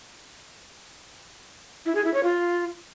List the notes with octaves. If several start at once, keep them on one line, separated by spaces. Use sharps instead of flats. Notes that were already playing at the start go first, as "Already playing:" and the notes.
E4
G#4
E4
C#5
F4